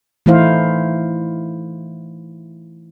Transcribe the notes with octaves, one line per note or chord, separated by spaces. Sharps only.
E3 A3 D#4 E4 C5 F5